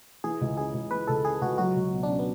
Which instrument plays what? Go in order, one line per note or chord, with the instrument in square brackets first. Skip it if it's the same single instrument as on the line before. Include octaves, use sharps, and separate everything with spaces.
[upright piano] E3 [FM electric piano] G#4
[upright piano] C#2
[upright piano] C#3 [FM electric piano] G#4
[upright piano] C#2
[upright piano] E3 [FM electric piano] B4
[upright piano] C#2 [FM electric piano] A4
[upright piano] C#3 [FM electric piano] G#4
[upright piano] C#2 [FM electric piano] F#4
[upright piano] F#3 [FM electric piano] F#4
[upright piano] C#2
B2
[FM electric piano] D4
[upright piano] C#4
[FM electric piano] B3